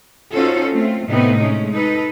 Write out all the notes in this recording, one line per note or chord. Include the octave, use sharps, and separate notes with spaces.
C#4 D#4 F4 F#4 A4 C5
A3 C4 F4
A2 C3 A3 B3 C4 D#4
G#3 A3 C#4
D#4 A4 B4